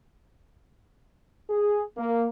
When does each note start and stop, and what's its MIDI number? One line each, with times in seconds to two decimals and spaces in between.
1.50 1.83 68
1.97 2.27 58